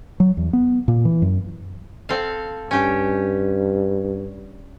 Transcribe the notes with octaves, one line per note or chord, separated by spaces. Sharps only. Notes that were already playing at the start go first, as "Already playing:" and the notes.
F#3
E2
B3
A#2
E3
F#2
C4 A4 F5
G2 C#4 G4